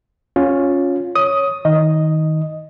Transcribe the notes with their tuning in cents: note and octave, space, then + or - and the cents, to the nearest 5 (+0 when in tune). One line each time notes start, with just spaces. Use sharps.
C#4 +0 F4 +15
C#5 +0 D#6 +10
D#3 +20 D#5 +0